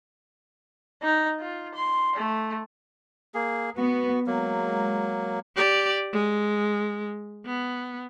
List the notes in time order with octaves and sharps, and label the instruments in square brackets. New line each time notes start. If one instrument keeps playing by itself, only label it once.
[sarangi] D#4
F4
C6
A3
[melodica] A#3 G#4
[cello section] B3 [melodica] F#4
[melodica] F#3 A#3 [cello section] G#3
[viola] G4 D5
G#3
B3